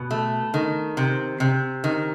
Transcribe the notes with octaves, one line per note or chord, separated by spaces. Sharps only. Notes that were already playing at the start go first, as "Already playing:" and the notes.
Already playing: B2
A3
D#3
C3
C3
D#3